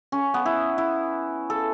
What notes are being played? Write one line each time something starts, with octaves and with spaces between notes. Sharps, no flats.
C#4
B3
E4
E4
A4